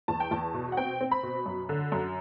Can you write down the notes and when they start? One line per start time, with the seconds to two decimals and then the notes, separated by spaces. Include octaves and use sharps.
0.08 E2 A5
0.20 G5
0.31 E2 A5
0.54 B2
0.72 F#5
0.77 C4 G5
1.01 C4
1.11 B5
1.23 B2
1.46 F#2
1.69 D3
1.92 F#2